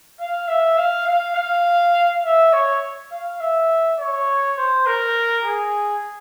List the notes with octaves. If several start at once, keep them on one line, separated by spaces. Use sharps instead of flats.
F5
E5
F5
F5
F5
E5
C#5
F5
E5
C#5
C5
A#4
G#4